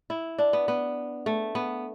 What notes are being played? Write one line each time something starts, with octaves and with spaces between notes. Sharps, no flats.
E4
D4
B3
B3
A3
B3